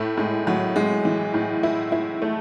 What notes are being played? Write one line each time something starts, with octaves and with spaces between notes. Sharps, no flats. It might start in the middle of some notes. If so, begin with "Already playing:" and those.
Already playing: A2 A3
A2 G#3
A2 F#3
A2 G#3
E3
A2
E4
E4
A3